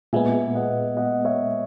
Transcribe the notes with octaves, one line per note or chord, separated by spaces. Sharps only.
A#2 G#3 B3 E5 G#5
D#5 F#5
D#5 F#5
C#5 E5